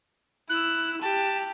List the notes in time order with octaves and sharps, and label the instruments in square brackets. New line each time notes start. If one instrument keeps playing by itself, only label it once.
[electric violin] E4 E6 [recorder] F#6
[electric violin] G4 [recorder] A5